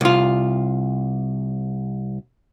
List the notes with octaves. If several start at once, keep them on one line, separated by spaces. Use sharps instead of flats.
C2 F4